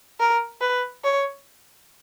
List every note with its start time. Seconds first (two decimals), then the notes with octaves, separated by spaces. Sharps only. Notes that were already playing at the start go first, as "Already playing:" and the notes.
0.20 A#4
0.61 B4
1.04 C#5